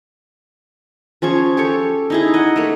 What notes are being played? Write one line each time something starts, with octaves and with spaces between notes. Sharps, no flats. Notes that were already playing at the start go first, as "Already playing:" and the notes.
F3 C#4 G#4 C#6
G4 A4 C#5 C#6
D#4 E4 G#4
D#5 F#5
A3 A#3